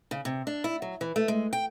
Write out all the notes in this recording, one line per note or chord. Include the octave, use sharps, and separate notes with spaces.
C#3
C3
D4
E4
F#3
E3
A3
G#3
G5